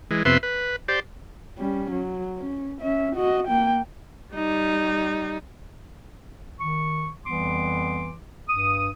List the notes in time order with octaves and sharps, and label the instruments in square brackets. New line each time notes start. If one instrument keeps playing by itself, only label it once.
[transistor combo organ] E3 G#3
F2 C3 B3 B4 E5 C6
B4
G4 C5 D5
[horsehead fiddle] G3 C#4
F#3
C#4
C#4 E5
F#4 D#5
A#3 G5
[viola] G3 D#4
[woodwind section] D#3 C#6
F2 E3 G3 B3 C6 D6
G2 D#6